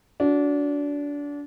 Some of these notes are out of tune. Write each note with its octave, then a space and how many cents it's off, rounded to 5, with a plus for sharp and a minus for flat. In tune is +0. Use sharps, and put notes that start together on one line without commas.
D4 -25 F#4 -10